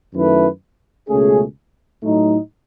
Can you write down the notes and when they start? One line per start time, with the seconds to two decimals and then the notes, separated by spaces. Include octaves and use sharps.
0.13 F#2 D#3 A3 E4 B4
1.08 C#2 B2 A3 C#4 G#4
2.03 A2 F#3 A3 D#4